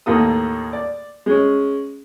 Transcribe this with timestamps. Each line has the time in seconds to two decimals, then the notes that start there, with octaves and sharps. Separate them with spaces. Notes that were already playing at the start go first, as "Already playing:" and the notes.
0.06 D#2 A2 A#3 A4 D#6
0.73 D5
1.26 G#3 C#4